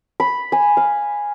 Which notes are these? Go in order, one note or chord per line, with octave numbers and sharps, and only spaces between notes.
B5
G#5
F5